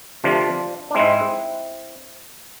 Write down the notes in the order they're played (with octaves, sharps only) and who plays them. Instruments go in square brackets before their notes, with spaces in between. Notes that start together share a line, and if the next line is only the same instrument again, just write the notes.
[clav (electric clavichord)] D2 C3 F3 D4 F4
D4
G#2 G#3 C4 E4